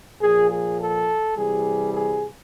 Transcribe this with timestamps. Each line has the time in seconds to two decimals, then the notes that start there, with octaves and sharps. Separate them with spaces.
0.21 A#2 F3 G#4
0.51 G#4
0.79 A4
1.37 C3 E3 G3 G#4
1.94 G#4